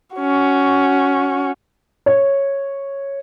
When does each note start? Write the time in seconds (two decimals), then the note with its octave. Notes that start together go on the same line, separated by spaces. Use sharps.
0.16 C#4 F#4
2.06 C#5